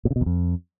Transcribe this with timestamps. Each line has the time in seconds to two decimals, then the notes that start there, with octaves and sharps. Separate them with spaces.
0.05 A#2
0.11 C#3
0.16 B2
0.21 E2
0.26 F2